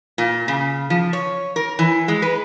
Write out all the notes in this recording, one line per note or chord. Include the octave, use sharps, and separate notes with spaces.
A#2
C#3
F3
C#5
A#4
E3
G#3
B4